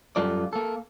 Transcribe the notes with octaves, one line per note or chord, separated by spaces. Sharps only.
F#2 G3 F4 A4 D5
A#3 A4